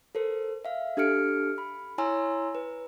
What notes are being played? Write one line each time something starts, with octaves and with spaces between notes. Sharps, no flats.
A4 A#4 C5
E5 F5
D4 G4 A4 F6 C#7 D7
B5
E4 C#5 G#5 A#5 C6 E6
B4